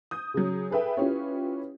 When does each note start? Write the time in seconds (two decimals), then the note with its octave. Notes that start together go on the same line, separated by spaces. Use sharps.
0.11 D#6 G6
0.34 C#3 F#3
0.70 G#4 A4 B4 E5 G5
0.97 C#4 E4 F4 G4 B4 C#5